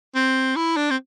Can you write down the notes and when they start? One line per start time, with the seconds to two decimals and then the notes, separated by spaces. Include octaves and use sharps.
0.15 C4
0.56 E4
0.76 D4
0.90 C4